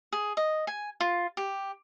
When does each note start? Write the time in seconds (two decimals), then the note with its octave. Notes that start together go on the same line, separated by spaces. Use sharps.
0.13 G#4
0.37 D#5
0.67 G#5
1.00 F4
1.37 G4